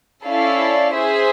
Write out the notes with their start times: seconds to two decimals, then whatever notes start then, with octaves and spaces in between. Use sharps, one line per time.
0.25 C#4 E4 A4 D5 F5
0.93 G#4 C5 E5